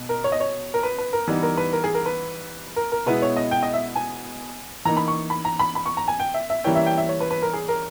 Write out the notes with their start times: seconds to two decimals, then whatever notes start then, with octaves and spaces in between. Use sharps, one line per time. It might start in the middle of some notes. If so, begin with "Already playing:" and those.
Already playing: B2
0.09 A#4
0.24 C#5
0.32 D#5
0.40 C#5
0.74 A#4
0.83 B4
0.98 B4
1.13 A#4
1.28 E3 G3 B3 D#4
1.43 A#4
1.57 B4
1.73 A#4
1.84 G#4
1.94 A#4
2.06 B4
2.76 A#4
2.92 A#4
3.06 B2 G#3 B3 E4 B4
3.22 C#5
3.37 D#5
3.51 G5
3.63 D#5
3.74 E5
3.96 G#5
4.85 E3 A#3 D#4 A#5
4.97 B5
5.08 C#6
5.30 B5
5.45 A#5
5.59 B5
5.75 B5
5.86 C#6
5.97 A#5
6.08 G#5
6.19 G5
6.34 E5
6.50 E5
6.64 E3 G3 A#3 C#4 E4 G5
6.75 E5
6.86 G5
6.97 E5
7.09 C#5
7.20 B4
7.31 B4
7.42 A#4
7.53 G#4
7.68 A#4